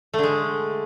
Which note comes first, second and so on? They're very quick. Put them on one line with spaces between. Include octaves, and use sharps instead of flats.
A3 D3 G#3